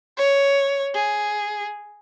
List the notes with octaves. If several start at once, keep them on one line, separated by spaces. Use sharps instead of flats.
C#5
G#4